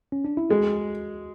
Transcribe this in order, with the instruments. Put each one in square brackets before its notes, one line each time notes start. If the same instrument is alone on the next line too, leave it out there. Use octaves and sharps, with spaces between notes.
[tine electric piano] C#4
D4
E4
[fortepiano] G#3 [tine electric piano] F#4